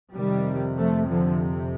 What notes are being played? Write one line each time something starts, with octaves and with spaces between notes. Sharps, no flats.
F2 C3 D#3 G3
F3 A3
D3 F3